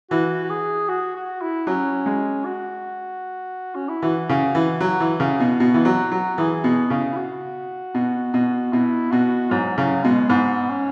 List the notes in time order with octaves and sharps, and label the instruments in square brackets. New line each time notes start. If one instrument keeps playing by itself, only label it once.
[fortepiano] E3 [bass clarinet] F#4
[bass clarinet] F#4
G#4
F#4
F#4
E4
[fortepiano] F#3 [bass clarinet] C#4
[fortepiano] G#3
[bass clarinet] F#4
C#4
E4
[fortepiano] E3 [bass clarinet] F#4
[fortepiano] C#3
E3
F#3
E3
C#3
B2
B2
E3
F#3
F#3
[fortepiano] E3 [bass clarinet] G#4
[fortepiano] B2
C#3
[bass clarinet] E4
F#4
[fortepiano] B2
B2
[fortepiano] B2 [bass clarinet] E4
[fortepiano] B2 [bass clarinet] F#4
[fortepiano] G#2 [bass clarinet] F#3
[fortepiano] C#3 [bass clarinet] F#3
[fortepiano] B2 [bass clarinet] G#3
[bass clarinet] G#3
[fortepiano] G#2 [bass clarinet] B3
[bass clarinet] C#4